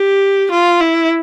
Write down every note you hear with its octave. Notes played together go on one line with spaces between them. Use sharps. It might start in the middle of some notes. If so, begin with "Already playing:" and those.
Already playing: G4
F4
E4